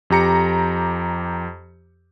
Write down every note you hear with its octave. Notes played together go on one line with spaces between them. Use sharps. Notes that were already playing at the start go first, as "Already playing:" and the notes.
F2 G4 A#5 C#7